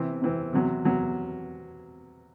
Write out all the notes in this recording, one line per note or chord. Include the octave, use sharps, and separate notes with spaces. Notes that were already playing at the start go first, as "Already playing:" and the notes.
Already playing: C3 E3 C4
C3 E3 C4
E2 C3 F#3
E2 C3 F#3